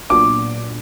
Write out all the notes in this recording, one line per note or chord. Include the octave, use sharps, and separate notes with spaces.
A#2 F#3 B3 D4 D6